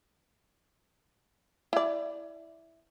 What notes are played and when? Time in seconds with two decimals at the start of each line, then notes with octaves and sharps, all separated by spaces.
1.73 E4 D5